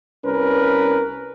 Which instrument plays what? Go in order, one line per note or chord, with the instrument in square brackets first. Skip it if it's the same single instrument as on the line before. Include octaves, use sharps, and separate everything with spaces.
[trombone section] C2 C#4 A#4 B4